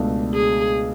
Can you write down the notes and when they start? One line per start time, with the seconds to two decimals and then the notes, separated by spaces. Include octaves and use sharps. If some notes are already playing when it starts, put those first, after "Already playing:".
Already playing: C#2 B2 A3 D4
0.34 G#4